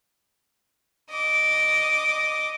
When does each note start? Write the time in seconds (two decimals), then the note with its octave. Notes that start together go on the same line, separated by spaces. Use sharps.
1.11 D#5 D6